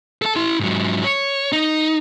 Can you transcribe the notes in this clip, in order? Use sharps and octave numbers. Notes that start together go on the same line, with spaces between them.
A4 A5
E4 C6
G#2 F#3
C#5
D#4